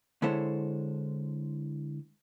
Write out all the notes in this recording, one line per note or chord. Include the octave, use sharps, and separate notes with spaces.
D3 G#3 E4 A4 C5 C#5